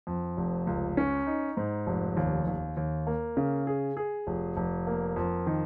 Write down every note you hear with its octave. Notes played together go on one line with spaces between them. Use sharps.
F2
F1
C#2
C#4
D#4
G#2
F1
D#2
D#2
D#2
A#3
C#3
G#4
G#4
F1
F1
A#3
F2
D#3